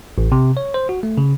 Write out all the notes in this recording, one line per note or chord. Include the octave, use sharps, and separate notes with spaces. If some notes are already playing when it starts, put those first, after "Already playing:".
A1
C3
C#5
C5
F#4
A3
C#3